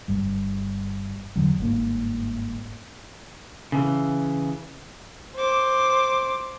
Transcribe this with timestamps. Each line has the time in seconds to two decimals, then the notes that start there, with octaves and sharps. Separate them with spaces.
0.08 G1 G2 G3
1.35 E2 D3 E3 F#3
1.59 G1 G#2 A#3
3.72 C#3 E3
5.35 C5 D6